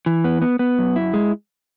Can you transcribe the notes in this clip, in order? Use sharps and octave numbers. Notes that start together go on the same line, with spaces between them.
E3
B3
B3
B3
F#2
E4
G#3